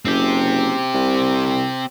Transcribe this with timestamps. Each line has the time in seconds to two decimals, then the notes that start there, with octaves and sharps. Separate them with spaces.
0.06 F#1 C4 G4
0.94 C2